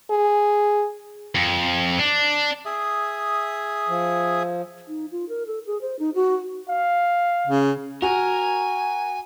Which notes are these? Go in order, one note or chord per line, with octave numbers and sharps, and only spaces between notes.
G#4
F2
D4
G#4 E5 D#6
F3
D#4
F4
A#4
A4
G#4
C5
D#4
F#4
F5
C#3
F#4 A#4 G#5